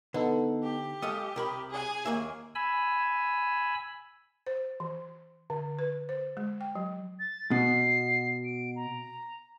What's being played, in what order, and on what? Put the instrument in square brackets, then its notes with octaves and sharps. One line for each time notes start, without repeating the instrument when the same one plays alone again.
[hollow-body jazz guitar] D3 [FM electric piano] B3 D#4 A4
[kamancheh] G4
[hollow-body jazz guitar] G#3 A4 F5 [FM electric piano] D#6
[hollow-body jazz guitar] C2 A#4 B5
[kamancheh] G#4 G#5
[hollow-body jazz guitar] D#2 A#3 E5
[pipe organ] G#5 B5 E6
[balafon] C5
E3
D3
B4
C5
G#3
G5
F#3
[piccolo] A6
[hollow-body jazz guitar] B2 [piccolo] C7
[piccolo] D7
A#5